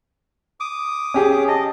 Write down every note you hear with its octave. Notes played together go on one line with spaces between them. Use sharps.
D6 D#6
C#4 G4 G#4
D#5 A5